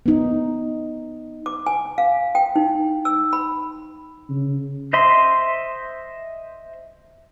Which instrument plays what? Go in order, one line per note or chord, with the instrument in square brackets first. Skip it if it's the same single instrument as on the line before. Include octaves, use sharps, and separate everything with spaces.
[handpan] B3 D#4
[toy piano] D6
G#5
F5
G5
D#4
E6
B5
[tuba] C#3
[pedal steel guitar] C5 D#5 E5 C6